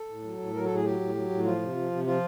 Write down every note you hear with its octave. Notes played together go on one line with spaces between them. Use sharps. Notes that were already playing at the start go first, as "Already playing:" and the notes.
Already playing: A4
A2
F#3
A2
F#3 A#4
A2 A4
G#4
F#3 G4
A2
F#3
A2
F3 F4
C3
F3
C3
F3 F4